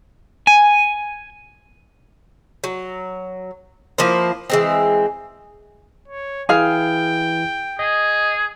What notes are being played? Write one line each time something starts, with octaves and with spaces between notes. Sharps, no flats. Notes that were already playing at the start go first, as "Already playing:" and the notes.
G#5
F#3
F3 A#3 E4 C5
E3 G#3 C4
C#5
E3 E4 G#4 F5 G5
G#4 D#5